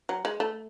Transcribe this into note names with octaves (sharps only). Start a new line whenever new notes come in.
F#3
G#3
A3